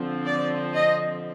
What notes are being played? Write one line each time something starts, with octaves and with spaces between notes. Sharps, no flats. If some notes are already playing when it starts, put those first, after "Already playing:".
Already playing: D3 F3 C4
D5
D#5